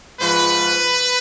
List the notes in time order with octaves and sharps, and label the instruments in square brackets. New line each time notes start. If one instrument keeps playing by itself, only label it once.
[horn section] G#2 F3 B4